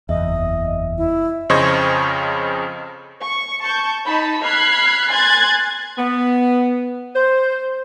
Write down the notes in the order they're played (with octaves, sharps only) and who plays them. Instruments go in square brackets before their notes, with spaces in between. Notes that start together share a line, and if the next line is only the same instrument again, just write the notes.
[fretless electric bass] F#1 E2 [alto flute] D#5 [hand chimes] E5
[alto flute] E4
[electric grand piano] F2 C#3 C5 D#5 C#6 G#6
[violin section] C#6
A5 C#6 G6
D#4 A5 B5
B5 F6 F#6 G#6 B6 C7
G#5 C6 F#6 G#6 A6
[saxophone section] B3
C5